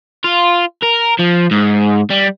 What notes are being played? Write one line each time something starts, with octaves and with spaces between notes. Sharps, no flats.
F4
A#4
F3
G#2
G3